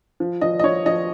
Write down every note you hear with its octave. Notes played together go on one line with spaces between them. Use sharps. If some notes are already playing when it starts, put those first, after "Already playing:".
F3
F3 D#5
D#5
F3 C#5
F3 D#5